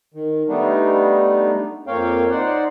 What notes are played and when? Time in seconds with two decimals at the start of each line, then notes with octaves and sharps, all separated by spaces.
0.14 D#3
0.48 G3 A3 B3 D4 D#4
1.87 F2 A#3 C4 C#5 F5 G5
2.30 D#4 C5 D5 F#5